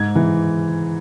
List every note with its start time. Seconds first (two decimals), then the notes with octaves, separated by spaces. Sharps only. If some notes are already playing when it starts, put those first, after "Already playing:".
Already playing: G#2 G#6
0.15 E3